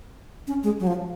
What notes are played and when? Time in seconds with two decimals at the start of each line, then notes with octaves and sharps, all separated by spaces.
0.47 C#4
0.63 G#3
0.80 F#3
0.87 F3